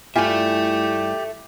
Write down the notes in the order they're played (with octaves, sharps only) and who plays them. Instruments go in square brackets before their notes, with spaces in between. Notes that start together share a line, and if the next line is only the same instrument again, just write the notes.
[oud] G2 E4 [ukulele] F4 G#5 [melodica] G4 [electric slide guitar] A4 E5